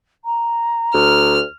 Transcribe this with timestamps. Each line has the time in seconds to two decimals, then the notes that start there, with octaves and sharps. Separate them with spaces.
0.25 A#5
0.94 D2 F6